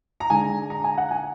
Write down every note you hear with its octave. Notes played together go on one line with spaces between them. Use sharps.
A#5
D3 G#3 D4 G#5
A#5
G#5
F#5
G#5